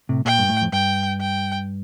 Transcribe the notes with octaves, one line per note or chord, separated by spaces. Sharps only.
A2 C3
A#2 G5
G2
A2
F2
G2 G5
G5